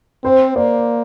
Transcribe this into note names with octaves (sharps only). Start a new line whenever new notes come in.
C4 C5
A#3 D5